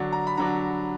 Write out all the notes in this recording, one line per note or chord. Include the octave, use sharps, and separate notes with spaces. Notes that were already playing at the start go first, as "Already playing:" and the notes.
Already playing: D3 F#3 D4
A#5
B5
D3 F#3 D4 A#5